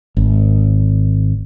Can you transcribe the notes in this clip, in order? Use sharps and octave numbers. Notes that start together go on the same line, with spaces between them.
G#1